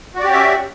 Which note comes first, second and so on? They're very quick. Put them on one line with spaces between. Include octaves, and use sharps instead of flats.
F#4 D5 G4 C#4 E5